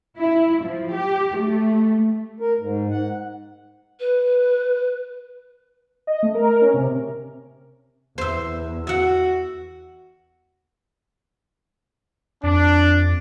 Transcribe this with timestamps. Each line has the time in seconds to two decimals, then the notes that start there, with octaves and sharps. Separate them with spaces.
0.18 E4
0.64 F3
0.94 G4
1.39 A3
2.40 A#4
2.60 G#2
2.91 F#5
3.99 B4
6.07 D#5
6.23 A3
6.35 A#4
6.62 C#4
6.74 C3
8.18 E2 C5 E5
8.87 F#4 E5 F#5
12.43 F2 D4